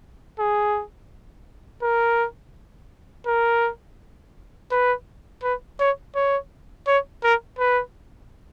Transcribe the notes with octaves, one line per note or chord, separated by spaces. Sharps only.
G#4
A#4
A#4
B4
B4
C#5
C#5
C#5
A#4
B4